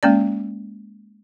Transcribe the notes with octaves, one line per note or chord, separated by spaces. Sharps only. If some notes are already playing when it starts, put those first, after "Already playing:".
G#3 A#3 C#4 D5